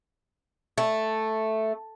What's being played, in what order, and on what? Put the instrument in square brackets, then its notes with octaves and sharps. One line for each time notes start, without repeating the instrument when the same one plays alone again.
[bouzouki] A3